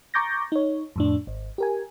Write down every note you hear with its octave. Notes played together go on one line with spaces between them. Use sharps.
A#5 C#6 D6 G6 A6 A#6
D#4 C#5
F2 A2 D4
G#1
G4 A#4 G#5